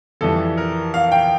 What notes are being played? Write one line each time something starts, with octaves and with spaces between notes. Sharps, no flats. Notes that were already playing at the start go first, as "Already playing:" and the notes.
F2 E3 G3 A4
A#4
F5
G5